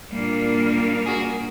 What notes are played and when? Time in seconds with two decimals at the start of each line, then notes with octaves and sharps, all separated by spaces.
0.11 A#2 G3 A#3 D4
1.06 F#4 G#4